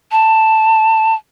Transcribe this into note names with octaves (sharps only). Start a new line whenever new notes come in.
A5